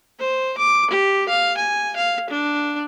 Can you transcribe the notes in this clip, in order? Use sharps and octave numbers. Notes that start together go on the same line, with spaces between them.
C5
D6
G4
F5
G#5
F5
D4